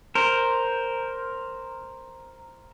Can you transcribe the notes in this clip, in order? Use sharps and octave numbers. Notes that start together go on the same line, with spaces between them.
A#4 C5